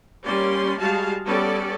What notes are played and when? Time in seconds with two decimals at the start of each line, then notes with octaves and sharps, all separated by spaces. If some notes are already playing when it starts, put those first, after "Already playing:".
0.25 G3 A#3 C#4 D5 C6
0.80 G3 G#3 F#4 G#4 F5 A5
1.25 G3 B3 C#4 A4 D5